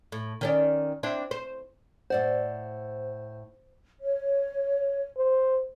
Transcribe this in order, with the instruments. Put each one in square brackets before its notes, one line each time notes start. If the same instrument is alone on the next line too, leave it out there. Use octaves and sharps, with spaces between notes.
[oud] A2
D#3 C#4 D5
C4 D4 E4
C5
[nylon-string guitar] A2 D5 F#5 [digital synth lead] C5
[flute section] C#5
[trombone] C5